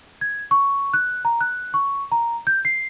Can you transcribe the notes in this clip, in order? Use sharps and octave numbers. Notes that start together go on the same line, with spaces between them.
G#6
C#6
F#6
A#5
F#6
C#6
A#5
G6
C7